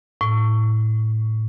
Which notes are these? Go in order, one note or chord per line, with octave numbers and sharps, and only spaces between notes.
A2